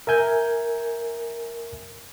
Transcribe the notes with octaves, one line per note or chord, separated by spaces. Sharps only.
A#4 E5 G#5 G6